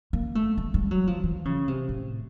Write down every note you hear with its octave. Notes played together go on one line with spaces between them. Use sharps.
A#3
A3
G#3
G3
F#3
F3
E3
C#3
C3
A2